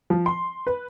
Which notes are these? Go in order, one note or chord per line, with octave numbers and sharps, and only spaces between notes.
F3
C6
B4